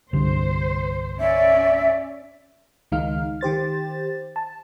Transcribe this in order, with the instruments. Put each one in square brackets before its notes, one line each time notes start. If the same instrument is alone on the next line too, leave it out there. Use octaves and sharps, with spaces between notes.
[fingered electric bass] C2 G2 D3 [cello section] C5
[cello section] C#4 D5 [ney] E5
[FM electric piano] C#2 D#3 G#3 D#4 F5 F6
D#3 G4 C5 A6
A5